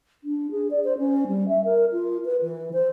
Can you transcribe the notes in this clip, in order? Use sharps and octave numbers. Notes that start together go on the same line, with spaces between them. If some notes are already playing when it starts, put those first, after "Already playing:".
D4
G#4
D5
C5
C#4
G3
E5
A#4
F4
B4
E3
C5